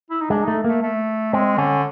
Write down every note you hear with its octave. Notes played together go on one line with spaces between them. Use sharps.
E4
D#4
G#3 D4
A3 D#4
A3 A#3
A3
G#3 C4
D3 C#4